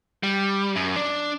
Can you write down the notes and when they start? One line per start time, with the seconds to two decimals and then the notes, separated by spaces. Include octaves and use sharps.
0.23 G3
0.76 F#2
0.96 D4 D5